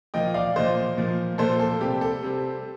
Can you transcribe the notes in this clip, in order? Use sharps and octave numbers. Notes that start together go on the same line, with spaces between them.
A#2 F3 A#3 D#5 G5
D5 F5
A#2 F3 A#3 C5 D#5
A#2 F3 A#3
A#2 F3 A#3 A4 C5
A4
C3 G3 C4 G4
A4
C3 G3 C4